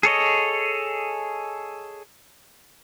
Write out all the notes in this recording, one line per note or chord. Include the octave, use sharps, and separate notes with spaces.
G#4 A4 C#5 D#5